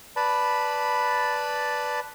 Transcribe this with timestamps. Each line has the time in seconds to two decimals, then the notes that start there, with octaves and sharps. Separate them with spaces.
0.16 B4 D5 A5 B5